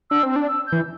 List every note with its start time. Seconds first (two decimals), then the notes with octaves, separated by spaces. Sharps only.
0.10 D4 E6
0.23 C4
0.36 D4
0.48 E6
0.66 G6
0.72 E3